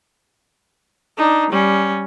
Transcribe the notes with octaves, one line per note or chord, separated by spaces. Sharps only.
D4 D#4
G3 C#4